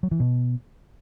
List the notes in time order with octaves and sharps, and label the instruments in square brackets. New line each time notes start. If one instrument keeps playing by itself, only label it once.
[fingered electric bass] F#3
E3
B2